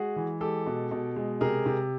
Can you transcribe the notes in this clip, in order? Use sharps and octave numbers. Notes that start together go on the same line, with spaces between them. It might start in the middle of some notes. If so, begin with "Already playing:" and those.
Already playing: G#3 F#4 G#4
E3
G#3 G4 A4
B2
B2
G#3
C3 G#4 A#4
C3